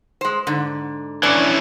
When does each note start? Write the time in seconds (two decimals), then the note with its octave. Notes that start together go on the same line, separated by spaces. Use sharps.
0.21 G#3 C5
0.47 G#2 D3
1.23 E3 C#4 D4